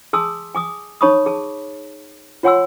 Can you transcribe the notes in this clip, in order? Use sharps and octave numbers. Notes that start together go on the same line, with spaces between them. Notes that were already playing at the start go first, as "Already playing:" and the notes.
G#4 G#5 A5 C6 D#6 E6
G#5 D6 D#6
D#4 C#5 A5 B5 C#6 D#6
G#4 A5
F4 C#5 F#5 G#5 C6 E6